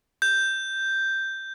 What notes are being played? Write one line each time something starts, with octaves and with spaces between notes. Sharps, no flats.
G6